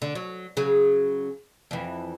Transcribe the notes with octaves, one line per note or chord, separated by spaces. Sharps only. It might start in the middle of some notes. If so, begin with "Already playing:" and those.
D3
F#3
C#3 F#3 G#4
F2 E3